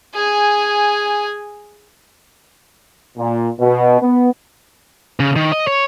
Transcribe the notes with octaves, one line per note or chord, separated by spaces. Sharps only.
G#4 G#5
A#2
B2
B3
C#3
D#3
D#5
C#5